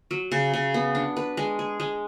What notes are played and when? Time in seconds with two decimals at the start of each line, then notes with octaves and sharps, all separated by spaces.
0.11 F#3
0.31 C#3
0.54 C#3
0.74 B3
0.95 D4
1.17 B4
1.37 G#3
1.59 G#4
1.80 G#3